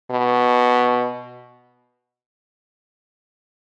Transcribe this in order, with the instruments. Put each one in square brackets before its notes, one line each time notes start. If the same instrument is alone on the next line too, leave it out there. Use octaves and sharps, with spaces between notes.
[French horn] B2